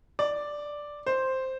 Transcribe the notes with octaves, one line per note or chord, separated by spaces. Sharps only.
D5
C5